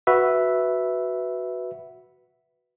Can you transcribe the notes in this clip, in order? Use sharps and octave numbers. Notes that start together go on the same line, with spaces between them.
F#4 B4 E5